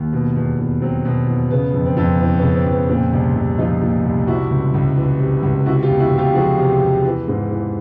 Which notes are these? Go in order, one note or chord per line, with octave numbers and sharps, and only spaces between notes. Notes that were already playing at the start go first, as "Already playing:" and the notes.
Already playing: D#2
B2
E2
E2
F#3 C4
B2
E2
C#3 B3
F2
C4
F2
E3 C4
B3 C#4
C#3
C4
F2
B3
A#2 C4
C2
C2
F3 D#4 F4
A#2
C2
C3 E4 F#4
C#2
C#2
E3
C3
C#2
C3 E4 F#4
F4 G4
E2
E4 F#4
E2
F4 G4
F3 F#4 G#4
C3
E2
E3
G#2
E3